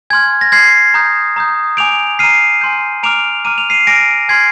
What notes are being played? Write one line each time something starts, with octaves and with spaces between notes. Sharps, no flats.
G#5 C6 F6 G#6
A#6
C6 F6 G#6 C7
A#5 D#6 G6
A#5 D#6 G6
G#5 D6 G6 D7 F7
A#5 F6 C7 D#7
G#5 C6 G6
A#5 D6 F6 D7 F7
A#5 D6 F6 D#7
F7
C7 D#7
G#5 D6 F6 A#6 D7
G#5 C6 F6 G#6 C7